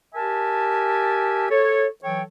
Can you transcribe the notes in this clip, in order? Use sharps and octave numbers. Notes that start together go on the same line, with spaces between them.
G4 A#4 E5 G#5 A5
A4 C#5
E3 F#3 A4 C#5 G5